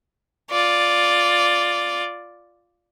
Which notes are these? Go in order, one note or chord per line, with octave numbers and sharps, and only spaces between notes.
F4 D5